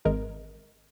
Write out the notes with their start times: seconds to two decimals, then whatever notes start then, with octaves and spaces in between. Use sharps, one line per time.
0.05 G#1 G#3 A#4